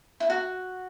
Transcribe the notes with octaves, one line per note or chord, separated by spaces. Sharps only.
E4
F#4